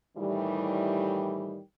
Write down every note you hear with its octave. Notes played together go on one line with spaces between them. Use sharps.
A2 D#3 E3 G3